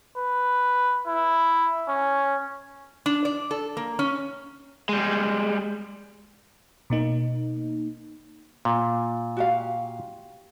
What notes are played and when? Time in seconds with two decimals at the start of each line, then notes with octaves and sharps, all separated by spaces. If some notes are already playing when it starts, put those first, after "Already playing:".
0.18 B4
1.08 E4
1.89 C#4
3.06 D4
3.25 D5
3.51 A4
3.77 A#3
3.99 C#4
4.89 G3 G#3
6.90 B2 A#3 D#4
8.65 A#2
9.37 F#4 G4 F5